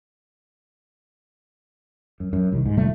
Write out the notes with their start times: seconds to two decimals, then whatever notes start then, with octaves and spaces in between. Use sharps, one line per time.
2.20 F#2
2.33 F#2
2.52 C2 D#3
2.66 G#2
2.77 F1 D3 G3 A3